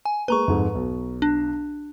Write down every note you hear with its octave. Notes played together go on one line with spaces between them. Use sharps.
G#5
G#3 A#3 B4 A#5 C#6
F2 G#2
B1
D4